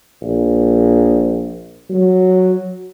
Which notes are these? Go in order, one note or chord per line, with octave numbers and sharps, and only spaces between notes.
A#1
F#3